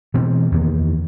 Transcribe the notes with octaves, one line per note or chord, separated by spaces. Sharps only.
B2 E3 C4
E2 D#3 A#3